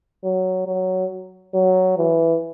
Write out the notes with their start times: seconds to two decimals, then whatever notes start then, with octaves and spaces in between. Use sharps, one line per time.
0.24 F#3
0.67 F#3
1.54 F#3
1.98 E3